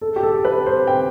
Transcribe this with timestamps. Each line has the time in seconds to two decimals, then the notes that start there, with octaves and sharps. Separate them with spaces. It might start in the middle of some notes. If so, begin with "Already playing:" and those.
0.01 A4
0.16 G4
0.23 A4
0.45 B4
0.66 C5
0.87 G5